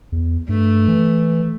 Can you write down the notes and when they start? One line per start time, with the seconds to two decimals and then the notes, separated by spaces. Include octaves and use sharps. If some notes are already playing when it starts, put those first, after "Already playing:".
0.12 E2
0.49 G2 A3
0.88 E3